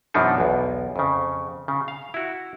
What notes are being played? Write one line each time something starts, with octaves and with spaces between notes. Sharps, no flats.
F#2 B2 E3 F3 D4 D#4
B1 E2
F2 C#3
C#3
F5
E4 F#4